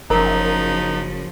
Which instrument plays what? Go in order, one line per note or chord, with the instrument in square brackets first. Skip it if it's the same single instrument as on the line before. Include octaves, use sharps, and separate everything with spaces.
[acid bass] F#1 [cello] C#3 F3 [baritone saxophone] D#4 [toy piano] A#4 A#5